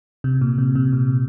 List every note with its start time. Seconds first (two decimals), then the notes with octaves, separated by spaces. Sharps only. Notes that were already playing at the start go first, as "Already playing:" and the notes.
0.24 C3
0.41 A#2
0.58 C3
0.75 C3
0.93 A#2